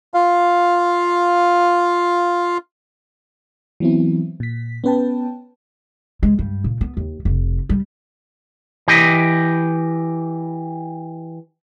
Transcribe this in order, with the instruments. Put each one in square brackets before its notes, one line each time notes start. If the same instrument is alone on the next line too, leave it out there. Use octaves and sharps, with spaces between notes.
[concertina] F4 F5
[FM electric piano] E3 F#3 B3 C4 E4
A#2 B6
B3 C#4 B4 G5 A5
[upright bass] G#3
G2
A#2
B3
D#2
F1
G3
[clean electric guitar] E3 G4 D#5